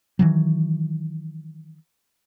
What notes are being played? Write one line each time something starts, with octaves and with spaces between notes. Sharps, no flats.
D#3 E3 F#3